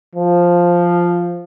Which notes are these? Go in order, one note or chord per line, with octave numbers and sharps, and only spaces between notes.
F3